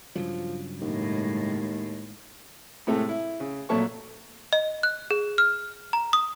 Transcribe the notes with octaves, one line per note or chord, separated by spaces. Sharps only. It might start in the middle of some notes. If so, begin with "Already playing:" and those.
G2 C#3 F3 F#3
D#2 A2 G#3
A2 C3 G#3 A3
E4
C#3
A#1 A#2 F#3 A3 A5 C#6
D#5
F#6
G#4
F6
A#5
D#6